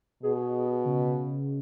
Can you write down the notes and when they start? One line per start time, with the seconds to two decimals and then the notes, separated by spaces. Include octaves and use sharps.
0.23 B2 G#4
0.85 C#3